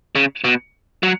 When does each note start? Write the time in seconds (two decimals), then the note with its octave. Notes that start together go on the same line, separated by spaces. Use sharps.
0.15 C#3
0.44 B2
1.03 F#3